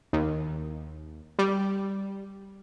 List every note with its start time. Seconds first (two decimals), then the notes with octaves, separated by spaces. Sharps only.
0.13 D#2
1.39 G3